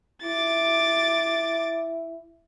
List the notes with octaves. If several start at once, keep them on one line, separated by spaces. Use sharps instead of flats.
E4 D6 A6